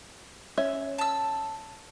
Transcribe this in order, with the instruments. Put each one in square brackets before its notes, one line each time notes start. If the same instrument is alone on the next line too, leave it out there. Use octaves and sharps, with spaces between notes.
[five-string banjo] C#4 E5
[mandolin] A5 E6